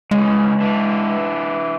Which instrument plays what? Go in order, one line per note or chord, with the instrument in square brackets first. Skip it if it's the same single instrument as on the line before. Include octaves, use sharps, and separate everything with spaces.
[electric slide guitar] C#3 E3 [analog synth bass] G#3
[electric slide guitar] E3 D4